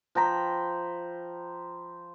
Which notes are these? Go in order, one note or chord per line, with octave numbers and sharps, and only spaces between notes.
F3 G5 A#5 B5